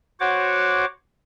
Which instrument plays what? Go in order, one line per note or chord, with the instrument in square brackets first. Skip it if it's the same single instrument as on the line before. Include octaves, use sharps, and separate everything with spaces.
[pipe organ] F#4 C5 C#5 F#5 D6